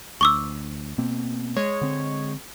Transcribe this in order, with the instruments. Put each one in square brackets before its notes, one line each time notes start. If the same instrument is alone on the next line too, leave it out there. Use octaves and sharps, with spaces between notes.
[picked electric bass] D2 [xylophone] C#6 D6 E6
[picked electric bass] B2 A#3 C4
[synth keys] G#3 C#5
[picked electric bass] D3 C4